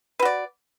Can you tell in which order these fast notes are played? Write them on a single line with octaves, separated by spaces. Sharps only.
B4 F#4 D5